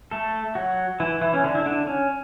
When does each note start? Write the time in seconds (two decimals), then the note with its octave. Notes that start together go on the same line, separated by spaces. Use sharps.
0.11 A3 A4
0.55 F#3 F#4
1.00 E3 E4
1.21 E3 E4
1.34 C#4
1.44 D3 D4
1.55 E4
1.66 D3 D4
1.87 C#4